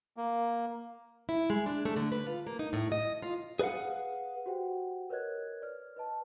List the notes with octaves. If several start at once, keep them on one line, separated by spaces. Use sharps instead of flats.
A#3
E4
G#3
D4
A3
D3
B4
F4
A#3
D#4
A2
D#5
F4
G#4 B4 D5 F5 F#5
F#4 G4 C5 F#5 G5
A#4 B4 C#5 D#5 F#6 G#6
D5 F6
B4 D#5 A5